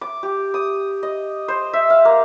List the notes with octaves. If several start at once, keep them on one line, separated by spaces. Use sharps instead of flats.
D6
G4
D#6
D#5
C5
E5
F5
A#3